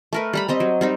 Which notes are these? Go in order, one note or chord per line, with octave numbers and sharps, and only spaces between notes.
A3 A#4 B4
G3 A#5 B5
G3 C4 D#5
F#3
G3 C4 D#4